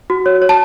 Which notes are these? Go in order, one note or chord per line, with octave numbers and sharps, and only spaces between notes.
F#4
C#5
C#5
A5